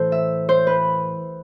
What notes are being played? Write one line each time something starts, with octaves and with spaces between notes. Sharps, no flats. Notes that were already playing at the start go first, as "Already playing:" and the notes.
Already playing: A2 E3 A4 C5
E5
C5
B4